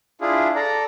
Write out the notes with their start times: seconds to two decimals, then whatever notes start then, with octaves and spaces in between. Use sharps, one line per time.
0.21 D4 E4 F4 G#4
0.55 A4 D5 A#5